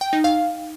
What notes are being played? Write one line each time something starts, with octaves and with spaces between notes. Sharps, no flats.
G5
D#4
F5